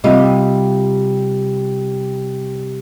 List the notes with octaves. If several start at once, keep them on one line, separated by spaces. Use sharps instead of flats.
C3 G3 F4 D#5